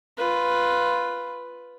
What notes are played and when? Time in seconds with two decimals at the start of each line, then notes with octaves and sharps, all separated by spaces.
0.17 F4 B4